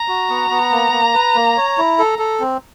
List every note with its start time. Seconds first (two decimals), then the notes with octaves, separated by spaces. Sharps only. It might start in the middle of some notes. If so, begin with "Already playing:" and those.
Already playing: A#5
0.08 F#4
0.29 B3
0.51 B3
0.72 A#3
0.92 A#3
1.14 B4
1.35 A#3
1.57 C#5
1.78 E4
1.99 A4
2.19 A4
2.40 C4